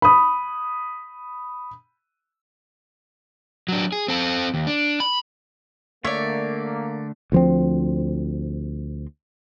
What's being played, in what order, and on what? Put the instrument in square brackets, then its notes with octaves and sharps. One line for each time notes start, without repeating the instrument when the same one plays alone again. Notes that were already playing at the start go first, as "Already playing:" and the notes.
[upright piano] B5 D#6
[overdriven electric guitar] F#3 D4
G#4
C4 A4
D#2
D4
B5
[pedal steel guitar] D3 A3 E5 [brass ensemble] A#3 [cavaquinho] C#5 D5
[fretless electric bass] D2 F3 C4